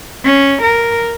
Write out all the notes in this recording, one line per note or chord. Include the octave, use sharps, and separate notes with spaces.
C#4
A#4